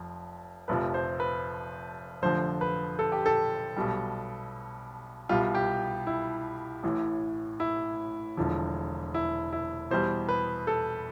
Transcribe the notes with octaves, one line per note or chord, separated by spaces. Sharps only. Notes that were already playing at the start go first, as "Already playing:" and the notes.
Already playing: F1 F2
F1 F2 C3 F3 B4
C5
B4
F1 F2 D3 F3 C5
B4
A4
G4
A4
B1 B2 G3
C2 B2 G3 F4
G4
E4
A1 A2 E3
E4
E1 E2 D3 F3
E4
E4
E2 B2 G3 C5
B4
A4